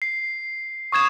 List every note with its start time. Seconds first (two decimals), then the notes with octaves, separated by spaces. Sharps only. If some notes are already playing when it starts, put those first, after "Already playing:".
0.02 C7
0.92 C#6 D#6 G#6 E7